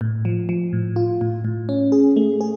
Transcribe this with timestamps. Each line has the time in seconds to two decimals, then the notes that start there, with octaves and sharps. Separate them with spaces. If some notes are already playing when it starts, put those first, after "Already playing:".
0.01 A2
0.25 F3
0.49 F3
0.73 A2
0.96 F4
1.21 A2
1.45 A2
1.69 C#4
1.92 G#4
2.16 A3
2.41 G#4